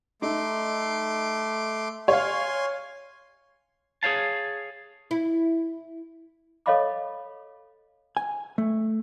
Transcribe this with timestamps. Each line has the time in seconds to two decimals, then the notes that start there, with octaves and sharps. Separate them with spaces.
0.22 A3 D#4 C6 D6
2.08 C#5 F5 G#5 C6
4.03 G#4 C5 C#5 F5 A5
5.11 E4
6.66 A4 C#5 D#5 F5 B5 D6
8.17 G#5
8.58 A3